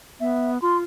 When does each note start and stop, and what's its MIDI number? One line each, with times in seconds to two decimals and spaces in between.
0.20 0.61 59
0.20 0.51 76
0.62 0.83 65
0.62 0.77 84